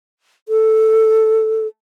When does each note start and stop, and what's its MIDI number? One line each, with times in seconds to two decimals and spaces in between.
0.49 1.67 69